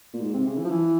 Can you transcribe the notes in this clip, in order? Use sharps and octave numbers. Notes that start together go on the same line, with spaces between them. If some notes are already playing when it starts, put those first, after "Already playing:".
A#2
G#2
C3
C#3
E3
F3
E3